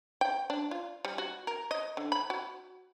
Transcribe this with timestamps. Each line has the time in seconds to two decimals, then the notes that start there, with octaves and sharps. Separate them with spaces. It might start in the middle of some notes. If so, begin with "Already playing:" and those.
0.21 G5
0.50 D4
0.71 F4
1.05 G3
1.18 F#4
1.47 A#4
1.71 D#5
1.97 D3
2.12 B5
2.30 F#4